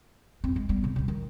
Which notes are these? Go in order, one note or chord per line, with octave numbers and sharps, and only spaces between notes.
F2 C4
G#3
G3 B3
C#3
D2 C#3
D#3